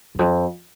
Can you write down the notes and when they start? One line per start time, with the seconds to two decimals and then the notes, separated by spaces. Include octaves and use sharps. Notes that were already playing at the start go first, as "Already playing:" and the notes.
0.15 E2
0.19 F2